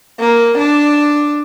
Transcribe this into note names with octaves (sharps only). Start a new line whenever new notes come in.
A#3
D4